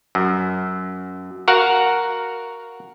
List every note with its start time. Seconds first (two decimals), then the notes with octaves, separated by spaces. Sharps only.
0.15 F#2
1.48 F#4 A#4 F5 F#5